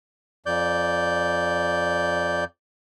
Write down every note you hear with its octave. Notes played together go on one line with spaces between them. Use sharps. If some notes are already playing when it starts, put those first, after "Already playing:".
F2 D5 G6